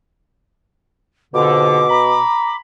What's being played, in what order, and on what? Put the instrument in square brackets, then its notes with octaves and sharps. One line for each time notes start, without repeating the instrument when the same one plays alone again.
[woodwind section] F2 G#2 D3 [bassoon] B2 [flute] D6
[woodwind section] A#5 B5